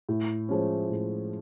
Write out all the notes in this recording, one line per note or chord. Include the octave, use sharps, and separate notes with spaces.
A2
F3 G#3 C#4
A2